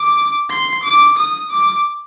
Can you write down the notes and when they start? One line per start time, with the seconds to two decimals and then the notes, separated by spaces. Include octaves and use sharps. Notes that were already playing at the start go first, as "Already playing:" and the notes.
Already playing: D6
0.50 C6
0.83 D6
1.17 D#6
1.51 D6